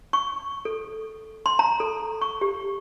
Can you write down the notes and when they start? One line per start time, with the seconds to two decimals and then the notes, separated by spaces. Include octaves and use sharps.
0.13 C#6
0.65 A4
1.46 C6
1.59 A#5
1.80 A4
2.21 C#6
2.41 G4